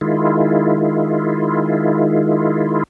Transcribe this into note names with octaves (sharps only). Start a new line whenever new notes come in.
D#3 G#3 E4 F4